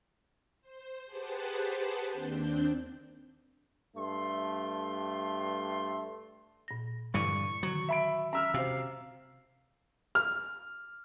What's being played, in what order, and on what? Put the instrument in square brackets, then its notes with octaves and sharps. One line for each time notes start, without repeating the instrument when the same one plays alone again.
[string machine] C5
G4 G#4 B4 C5 F#5 A5
D#2 C4 D4 G6
[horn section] G2 A3 C6
[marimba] A#2 A#6
[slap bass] G2 D3 E3 [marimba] B5 [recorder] C#6
[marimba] D3 D#3 [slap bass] F#3
[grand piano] E5 B5 D7
[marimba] C#4 [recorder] E5 [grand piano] A#5 E6 F6
[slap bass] C3 [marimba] F#4 C5 [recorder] F5
[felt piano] F6